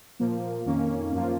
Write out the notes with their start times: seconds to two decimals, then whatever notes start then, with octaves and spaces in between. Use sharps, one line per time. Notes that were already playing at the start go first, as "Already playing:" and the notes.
0.19 A#2 F3 A#3
0.66 F2 D#3 A#3 C#4
1.13 F#2 F3 A#3 F4